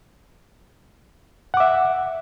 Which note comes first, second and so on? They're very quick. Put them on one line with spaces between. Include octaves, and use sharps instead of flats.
F#5 D6 E5